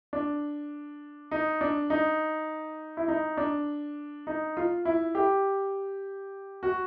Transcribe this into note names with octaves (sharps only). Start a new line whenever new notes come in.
D4
D#4
D4
D#4
E4
D#4
D4
D#4
F4
E4
G4
F#4